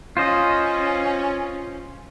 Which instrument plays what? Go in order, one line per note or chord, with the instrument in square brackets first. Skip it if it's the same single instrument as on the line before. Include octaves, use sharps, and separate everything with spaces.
[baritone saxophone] C#4 [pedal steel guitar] F4 C5 D#5